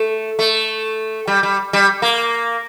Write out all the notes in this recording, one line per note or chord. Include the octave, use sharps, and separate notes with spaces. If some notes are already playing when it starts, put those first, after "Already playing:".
Already playing: A3
A3
G3
G3
G3
A#3